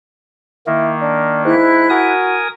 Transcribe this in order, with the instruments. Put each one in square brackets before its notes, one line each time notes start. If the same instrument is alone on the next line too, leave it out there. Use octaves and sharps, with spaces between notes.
[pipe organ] D#3 A#3 [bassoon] E4
[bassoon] D4
[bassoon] G#2 [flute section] E4 F#6
[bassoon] F#4 [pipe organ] A#4 G#5 D#6